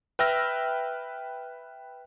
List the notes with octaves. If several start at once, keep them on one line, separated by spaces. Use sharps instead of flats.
B4 E5 G5 E6 F6 A#6